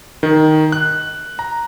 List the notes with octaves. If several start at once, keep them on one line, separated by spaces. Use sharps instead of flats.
D#3
F#6
A#5